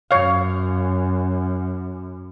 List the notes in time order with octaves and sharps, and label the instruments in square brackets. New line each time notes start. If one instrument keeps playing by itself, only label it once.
[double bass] F#2 [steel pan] C#5 F5